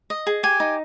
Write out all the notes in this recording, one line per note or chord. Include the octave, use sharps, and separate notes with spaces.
D#5
G#4
G4 G#5
D#4